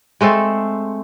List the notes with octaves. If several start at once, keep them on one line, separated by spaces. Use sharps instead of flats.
G#3 A3 C4 A4